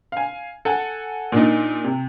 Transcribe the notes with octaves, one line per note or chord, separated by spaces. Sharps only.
F5 G#5
A4 F#5 G#5
A#2 D4 D#4
C3